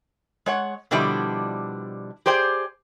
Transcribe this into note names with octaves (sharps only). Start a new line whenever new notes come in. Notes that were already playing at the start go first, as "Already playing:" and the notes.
G#3 C#5 F#5
B2 D3 F3 G3 D4 E4
G4 G#4 C5 D5 G5